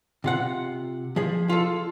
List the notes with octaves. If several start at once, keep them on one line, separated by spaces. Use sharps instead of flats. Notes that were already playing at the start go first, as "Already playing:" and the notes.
C3 F4 F#5
F3 G#4
F4 A4